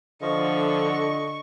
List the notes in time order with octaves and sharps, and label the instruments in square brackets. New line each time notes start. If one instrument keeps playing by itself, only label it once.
[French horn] D3 [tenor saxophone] F3 [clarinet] D#5 [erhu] C#6